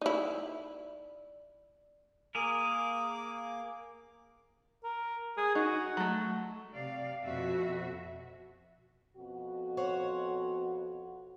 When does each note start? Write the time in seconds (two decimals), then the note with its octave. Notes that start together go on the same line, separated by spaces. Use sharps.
0.01 D#4 E4 D5
2.35 A#3 G#4 A#4 D6
4.84 A#4
5.38 G#4
5.55 D#4 F#4
5.97 F#3 A3
6.75 C3 D5 F5
7.24 F2 B2 F#4 E5
9.17 F2 B2 F#4
9.77 C5 C#5 F#5